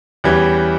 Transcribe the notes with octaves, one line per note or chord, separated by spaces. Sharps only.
E2 E3 G3 C#4 G4